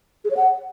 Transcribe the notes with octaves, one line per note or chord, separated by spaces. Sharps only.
G#4
C#5
F#5